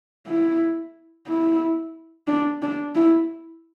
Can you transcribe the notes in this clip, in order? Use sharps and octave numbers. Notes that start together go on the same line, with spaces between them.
E4
E4
D4
D4
E4